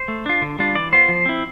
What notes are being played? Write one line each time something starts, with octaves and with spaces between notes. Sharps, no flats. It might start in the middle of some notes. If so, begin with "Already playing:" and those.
Already playing: C5
A3
D4 F4
D3
G3 D4 F4
E3 D5
B3 F4 C5
F3
C4 E4